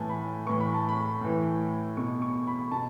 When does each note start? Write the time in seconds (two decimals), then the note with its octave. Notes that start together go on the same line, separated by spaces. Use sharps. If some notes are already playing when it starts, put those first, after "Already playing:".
Already playing: A2 E3 G#5 A5
0.09 B5
0.46 A2 E3 C#6
0.60 B5
0.74 A5
0.89 B5
1.21 A2 E3
1.97 B2 C#6
2.22 C#6
2.47 B5
2.71 B2 A5